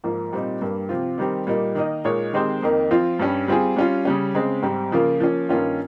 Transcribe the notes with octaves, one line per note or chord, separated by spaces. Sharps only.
G#2 F3 A#3
A#2 G3 C4 D#4
G2 G3 A#3
C3 F3 C4 F4
D#3 G3 C4 G4 A#4
A#2 G3 A#3 D#4 A#4
D#3 A#3 D#4 A#4 D#5
A#2 G#3 D#4 A#4 C#5
D#3 G#3 C4 G4 C5
F2 D#3 A#3 D#4 A#4
F3 C4 F4
G2 G3 C#4
G3 C4 F4 G#4
G3 C#4 F4
C#3 G3 C#4
C#3 G#3 C4
G#2 G3 C4
C#3 F3 A#3 F4 A#4
F3 A#3 C#4
G2 D#3 A#3 C#4 F4